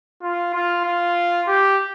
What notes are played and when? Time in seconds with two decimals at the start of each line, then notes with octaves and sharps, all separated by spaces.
0.22 F4
0.54 F4
0.85 F4
1.47 G4